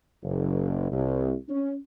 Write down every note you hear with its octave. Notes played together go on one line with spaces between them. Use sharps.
F#1
C2
C#4